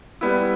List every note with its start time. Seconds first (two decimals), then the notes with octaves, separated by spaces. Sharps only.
0.21 G3 B3 E4